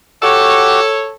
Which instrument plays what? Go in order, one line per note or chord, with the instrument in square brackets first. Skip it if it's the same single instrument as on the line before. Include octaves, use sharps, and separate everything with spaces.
[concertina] F#4 G4 [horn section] A4 C#5